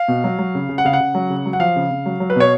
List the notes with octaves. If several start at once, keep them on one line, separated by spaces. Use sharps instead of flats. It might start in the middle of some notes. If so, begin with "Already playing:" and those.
Already playing: F5
B2
F#3
F#3
C#3
C#3
F#5
C#3 F5
F#5
C#3
F#3
C#3
F#3
F#5
F3 F5
C#3
C#3
F#3
F#3
B4
B2 C#5